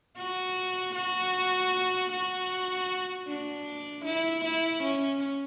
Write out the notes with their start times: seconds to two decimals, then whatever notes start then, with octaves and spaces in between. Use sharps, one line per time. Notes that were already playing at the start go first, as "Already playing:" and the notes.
0.18 F#4
0.95 F#4
2.12 F#4
3.28 D4
4.05 E4
4.44 E4
4.83 C#4